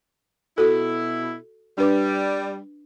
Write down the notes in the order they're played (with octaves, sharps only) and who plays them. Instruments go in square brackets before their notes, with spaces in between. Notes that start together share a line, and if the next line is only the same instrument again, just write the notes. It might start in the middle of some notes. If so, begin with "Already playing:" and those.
[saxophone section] B2 E4 [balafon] F#4 A4
[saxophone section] G3 [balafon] D4 B4 D6